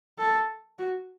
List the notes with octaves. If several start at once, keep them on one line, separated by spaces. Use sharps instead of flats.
A4
F#4